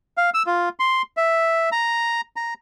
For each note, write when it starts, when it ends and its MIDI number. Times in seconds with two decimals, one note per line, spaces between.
0.17 0.30 77
0.34 0.43 88
0.47 0.69 65
0.80 1.02 84
1.17 1.69 76
1.72 2.21 82
2.36 2.54 82